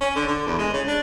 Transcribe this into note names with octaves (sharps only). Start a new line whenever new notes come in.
C#4
D3
D3
E2
G#3
C#3
D4